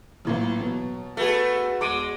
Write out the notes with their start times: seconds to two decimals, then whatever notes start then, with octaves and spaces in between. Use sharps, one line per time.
0.25 A1 A#2 E3 F#3
0.61 B2
1.17 A3 F#4 G#4 B4
1.81 E2 G#3 D6 D7 D#7